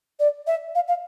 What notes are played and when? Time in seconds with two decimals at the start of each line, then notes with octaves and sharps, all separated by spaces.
0.19 D5
0.47 E5
0.75 F5
0.88 F5